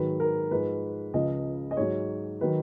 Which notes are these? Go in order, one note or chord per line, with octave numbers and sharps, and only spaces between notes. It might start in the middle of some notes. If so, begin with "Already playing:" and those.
Already playing: G#2 D#3 F#3 B4
A#4
G#2 F3 B4
C#2 C#3 F3 D#5
D#5
G#2 F#3 C#5
D#3 F#3 B4